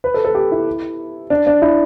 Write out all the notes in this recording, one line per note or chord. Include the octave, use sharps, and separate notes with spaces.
B4
A4
A4
G4
E4
D4
D4
E4